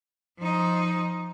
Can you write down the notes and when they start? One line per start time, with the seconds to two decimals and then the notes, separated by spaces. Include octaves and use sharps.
0.38 F3 D#4